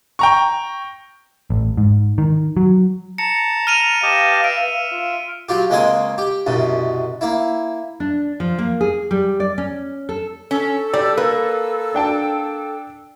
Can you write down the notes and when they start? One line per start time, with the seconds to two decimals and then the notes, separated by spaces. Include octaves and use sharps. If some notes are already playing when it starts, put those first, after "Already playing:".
0.19 G5 A#5 C#6
1.50 A1
1.77 G#2
2.18 D#3
2.57 F#3
3.18 A5 A#5 C#7
3.67 F6 D#7 F7
4.03 G4 B4 D#5 F5 A5
4.44 E5 D7
4.92 F4
5.49 F#3 F4 G4
5.70 C#2 G#3 A#3 C4 D#5 G#5
6.18 G4
6.46 C2 F#2 B2
7.21 A#3 E4
8.00 D4
8.40 F3
8.59 A#3
8.81 G#4
9.11 G3
9.40 D5
9.58 C#4
10.09 A4
10.51 C#4 A4
10.94 G3 D5
11.17 A#3 B4
11.94 D4 G5 A5